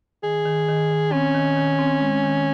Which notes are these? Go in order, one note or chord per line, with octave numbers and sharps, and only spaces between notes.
D#3 G#4
D#3
D#3
D#3
C4 C#4
D#3
D#3
C4
G#3
D#3